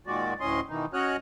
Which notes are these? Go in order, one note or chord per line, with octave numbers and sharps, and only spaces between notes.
A#2 D#3 G#3 F#4 D5
D2 A2 C#4 D#5 C6
B2 D#3 E3 D#4
C#4 F#4 C#5 D#5 F6 F#6